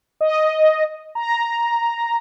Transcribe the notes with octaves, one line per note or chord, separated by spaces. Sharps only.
D#5
A#5